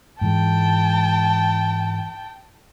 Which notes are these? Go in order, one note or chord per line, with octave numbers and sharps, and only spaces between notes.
G#2 E3 G#3 G5 A5